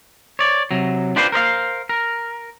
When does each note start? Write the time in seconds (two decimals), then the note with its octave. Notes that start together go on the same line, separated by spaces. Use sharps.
0.39 C#5 D5
0.71 C3 F#3
1.16 D4 F4 G4 B4 C5
1.32 A#4 C5 D#5 F5
1.89 A#4